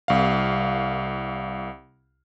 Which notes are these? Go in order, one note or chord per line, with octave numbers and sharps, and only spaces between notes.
C2 F5